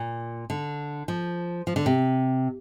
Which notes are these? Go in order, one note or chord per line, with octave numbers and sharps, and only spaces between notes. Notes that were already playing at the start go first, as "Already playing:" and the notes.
Already playing: A#2
D3
F3
F3
D3
C3